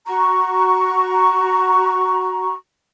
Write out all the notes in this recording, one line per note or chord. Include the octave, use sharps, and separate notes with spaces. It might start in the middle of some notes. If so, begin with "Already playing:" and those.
F#4 A#5 C#6